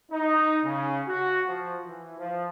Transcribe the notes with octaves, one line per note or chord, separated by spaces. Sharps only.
D#4
C#3
F#4
F3
E3
F3